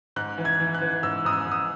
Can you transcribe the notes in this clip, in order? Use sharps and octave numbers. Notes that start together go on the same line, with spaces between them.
G#2 F#6
E3
G#6
E3
F#6
E3
G#2 E6
G#2 D#6
E6
G#2 D#6